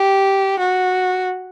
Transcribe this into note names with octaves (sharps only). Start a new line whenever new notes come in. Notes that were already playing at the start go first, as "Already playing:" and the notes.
Already playing: G4
F#4